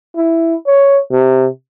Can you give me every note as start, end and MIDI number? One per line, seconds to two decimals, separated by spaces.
0.16 0.55 64
0.67 0.99 73
1.12 1.47 48